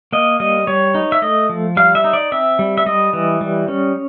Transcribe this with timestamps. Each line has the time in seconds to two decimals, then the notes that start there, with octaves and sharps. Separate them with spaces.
0.13 A#3 D#5
0.40 G3 D#5
0.67 G3 C#5
0.94 D#4
1.12 E5
1.22 A3 D#5
1.49 F3
1.77 G3 F5
1.95 E5
2.04 D#4
2.13 D5
2.32 C4 E5
2.59 G3
2.78 E5
2.86 G3 D#5
3.13 E3
3.41 G3
3.68 C#4